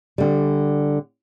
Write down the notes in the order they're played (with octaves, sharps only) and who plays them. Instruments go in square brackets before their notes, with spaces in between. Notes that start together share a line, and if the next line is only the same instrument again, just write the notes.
[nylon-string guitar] D3 G3